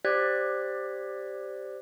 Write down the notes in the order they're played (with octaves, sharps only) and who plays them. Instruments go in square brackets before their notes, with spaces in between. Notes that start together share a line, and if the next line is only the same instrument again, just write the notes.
[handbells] G4 C5 D5 F#6 G#6 B6